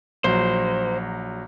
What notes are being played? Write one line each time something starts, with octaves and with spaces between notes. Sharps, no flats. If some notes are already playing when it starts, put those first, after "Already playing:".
A#1 F#3 C5